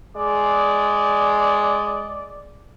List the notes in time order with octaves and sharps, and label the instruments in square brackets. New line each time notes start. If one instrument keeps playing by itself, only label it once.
[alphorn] G#3 [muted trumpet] D5